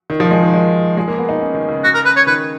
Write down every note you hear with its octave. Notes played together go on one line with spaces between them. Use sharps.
D#3
F3
G#3
D#3
G#3
G#3
A#3
B3
D#4
C#4
D#3
C#3
F#4
A#4
B4
C#5
D#3 B4